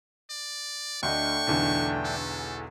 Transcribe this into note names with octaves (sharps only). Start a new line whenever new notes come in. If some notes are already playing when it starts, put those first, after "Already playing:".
D5
D2 A3 D4 D#5 G5 C#6
B1 E2 D3
A4